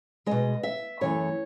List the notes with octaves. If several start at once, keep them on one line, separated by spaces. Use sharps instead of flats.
B2 G#3 D#5
E5
F#2 E3 A3 C#5